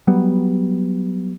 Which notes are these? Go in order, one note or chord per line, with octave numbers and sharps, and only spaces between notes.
F#3 G3 B3